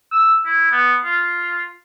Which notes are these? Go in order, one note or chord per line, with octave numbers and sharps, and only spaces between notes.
E6
E4
B3
F4